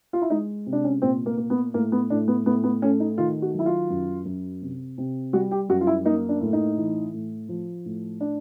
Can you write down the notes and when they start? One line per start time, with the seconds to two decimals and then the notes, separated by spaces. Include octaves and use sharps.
0.13 F4
0.22 E4
0.30 G#3 D#4
0.66 C3
0.73 D4
0.84 C#4
1.02 A#2 C4
1.26 A#3
1.38 A#3
1.50 B3
1.74 A2 A#3
1.92 B3
2.10 A2 D4
2.28 B3
2.46 A2 B3
2.64 B3
2.82 A3 C#4
3.00 D#4
3.18 D#3 F4
3.42 F#4
3.54 F#3
3.59 E4
3.66 F4
3.90 F#2
4.25 F#2
4.62 C3
4.98 C3
5.33 G3 F#4
5.51 G4
5.69 F#2 F#4
5.81 F4
5.87 E4
6.05 A#3 D#4
6.29 D4
6.41 A2
6.53 D#4
6.77 E3
7.13 A2
7.49 F3
7.85 A2
8.20 D4